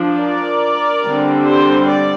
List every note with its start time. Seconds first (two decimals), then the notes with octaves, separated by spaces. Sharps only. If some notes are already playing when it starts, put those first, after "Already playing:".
Already playing: F3 D4
0.20 A#4 D5
1.03 D3 G3 C4
1.45 G4 C5
1.87 D5